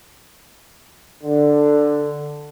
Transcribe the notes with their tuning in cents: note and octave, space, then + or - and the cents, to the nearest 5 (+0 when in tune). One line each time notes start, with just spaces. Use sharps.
D3 +5